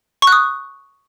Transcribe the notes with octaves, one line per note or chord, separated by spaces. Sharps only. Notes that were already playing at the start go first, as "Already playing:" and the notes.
C#6
F#6
D#6